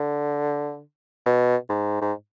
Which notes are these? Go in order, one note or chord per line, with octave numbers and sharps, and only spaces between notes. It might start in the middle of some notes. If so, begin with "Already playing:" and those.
Already playing: D3
B2
G#2
G#2